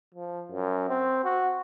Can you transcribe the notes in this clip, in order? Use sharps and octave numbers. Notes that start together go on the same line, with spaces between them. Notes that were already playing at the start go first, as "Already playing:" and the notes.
F3
F#2
C4
F#4